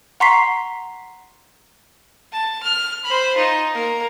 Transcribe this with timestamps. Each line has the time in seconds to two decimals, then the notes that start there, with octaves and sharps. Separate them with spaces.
0.20 F#5 A#5 C6 C#6 B6 C7
2.32 A5
2.63 F6
3.05 C5 B5
3.37 D#4 F4
3.74 A#3 A#4